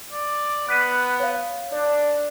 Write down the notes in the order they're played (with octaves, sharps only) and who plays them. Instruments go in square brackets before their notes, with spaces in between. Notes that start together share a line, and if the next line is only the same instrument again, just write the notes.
[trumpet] D5
[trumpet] B3 [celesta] F#6 B6 D#7
[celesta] C#5 F5
[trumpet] D4 [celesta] D5